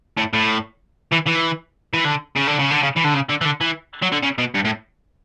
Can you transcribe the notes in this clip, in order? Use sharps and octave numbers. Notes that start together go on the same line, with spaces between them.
A2
A2
E3
E3
E3
D3
C#3
D3
C#3
D3
C#3
E3
D3
C#3
D3
E3
D3
E3
F#3
D3
C#3
B2
G2
A2